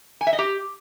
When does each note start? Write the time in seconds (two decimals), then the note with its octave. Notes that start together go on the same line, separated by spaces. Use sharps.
0.21 G#5
0.27 E5
0.33 D#5
0.39 G4